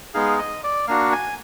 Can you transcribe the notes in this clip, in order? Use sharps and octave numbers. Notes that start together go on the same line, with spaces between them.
G#3 B3 D#4 G#4 F5
D#5
D5
A#3 D4 F#4 F5
G#5